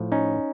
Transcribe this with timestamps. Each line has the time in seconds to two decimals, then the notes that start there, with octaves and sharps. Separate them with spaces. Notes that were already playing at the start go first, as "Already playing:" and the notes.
Already playing: A2 F3
0.12 C#4 D#4